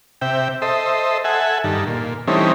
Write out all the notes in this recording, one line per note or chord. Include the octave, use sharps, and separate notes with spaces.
C3 E5 G5
A4 C5 D#5 E5
A4 E5 F#5 G#5
G2 D#3 A4
A#2
E3 G3 A3 C4 C#4 D#4